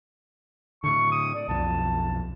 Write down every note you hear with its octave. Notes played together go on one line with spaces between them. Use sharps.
A2 D3 C#6
D#6
D5
B1 F2 A5